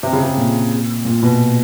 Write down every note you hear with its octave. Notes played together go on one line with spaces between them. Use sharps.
C3
C#3
C3
A#2
A#2
B2